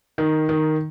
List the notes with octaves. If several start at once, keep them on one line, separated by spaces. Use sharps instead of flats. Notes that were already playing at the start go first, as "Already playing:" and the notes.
D#3
D#3